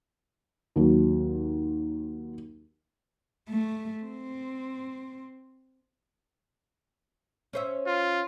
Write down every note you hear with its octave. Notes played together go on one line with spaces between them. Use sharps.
D#2 F#3
A3
C4
C#4 C5 E5
F4